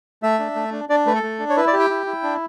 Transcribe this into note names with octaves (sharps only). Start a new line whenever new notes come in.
A3 E5
D4
A3
D4
D4 D5
A3 B4
A4
A3
D4
C#5
E4 B4
D5
G4
G5
E4
E4
D4